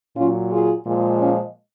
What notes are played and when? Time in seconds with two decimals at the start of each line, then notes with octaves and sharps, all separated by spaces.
0.16 A#2 F#3 C#4 F4
0.51 F4 G#4
0.86 A#2 F3 G#3
1.20 C#4 F4